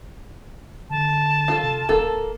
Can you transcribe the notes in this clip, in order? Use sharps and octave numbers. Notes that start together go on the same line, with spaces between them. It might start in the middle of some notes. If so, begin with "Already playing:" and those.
D3 A5
F4 A4
C3
D1 A#3 A4